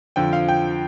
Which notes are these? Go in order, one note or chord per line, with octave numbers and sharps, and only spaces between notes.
F2 D3 F3 G5
F5
G5